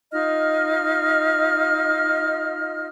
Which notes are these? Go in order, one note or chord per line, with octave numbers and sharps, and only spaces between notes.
D#4 F4 D#5 F6